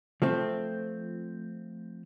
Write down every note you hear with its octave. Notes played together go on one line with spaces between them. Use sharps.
F3 A3 C4